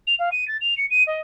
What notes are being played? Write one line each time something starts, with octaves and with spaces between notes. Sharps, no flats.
F7
F5
D#7
A6
F7
C#7
D#7
D#5